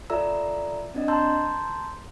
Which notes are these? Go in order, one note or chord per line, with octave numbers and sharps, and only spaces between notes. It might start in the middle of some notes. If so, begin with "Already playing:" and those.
F4 A4 D5 E5 A#5 E6
C4 D4 D#5
A5 A#5 C6 E6 G6